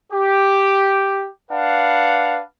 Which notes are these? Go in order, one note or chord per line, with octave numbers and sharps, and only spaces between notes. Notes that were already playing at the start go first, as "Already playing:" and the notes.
G4
D4 B4 F5 F#5